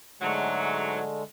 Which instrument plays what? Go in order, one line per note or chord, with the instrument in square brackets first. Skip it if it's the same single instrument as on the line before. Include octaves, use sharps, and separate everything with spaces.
[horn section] G#2 F#3 [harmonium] D3 G#3 A3